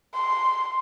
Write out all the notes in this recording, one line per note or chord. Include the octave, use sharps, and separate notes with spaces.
C6